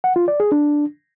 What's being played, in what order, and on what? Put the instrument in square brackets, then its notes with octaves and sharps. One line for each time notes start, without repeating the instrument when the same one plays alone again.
[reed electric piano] F#5
F4
D5
G#4
D4